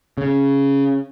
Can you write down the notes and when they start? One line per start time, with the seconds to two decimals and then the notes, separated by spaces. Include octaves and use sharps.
0.18 C#3